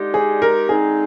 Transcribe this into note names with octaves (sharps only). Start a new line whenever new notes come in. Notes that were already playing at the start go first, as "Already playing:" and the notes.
Already playing: D3 G#3 D#4 G4 D5
G#4
A#4
D3 G#3 C4 D#4 G#4